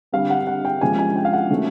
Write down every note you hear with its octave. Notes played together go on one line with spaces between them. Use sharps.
D3 G3 C4 F5
F#5
F#5
G5
C3 F3 G#3 C#4 G#5
G#5
G5
F5
F#5
C3 D#3 F#3 A3 C#4